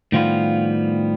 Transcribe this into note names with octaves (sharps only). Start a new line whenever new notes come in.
A2 D#3 F3 G3 B3 F4